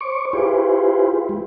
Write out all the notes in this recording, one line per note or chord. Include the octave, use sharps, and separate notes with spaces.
C5 C#5 C#6 D6
E4 F4 G4 G#4 B4 C5
G#3